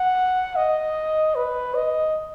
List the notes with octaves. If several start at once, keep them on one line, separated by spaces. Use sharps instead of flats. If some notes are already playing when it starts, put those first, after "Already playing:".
Already playing: F#5
D#5
B4
D#5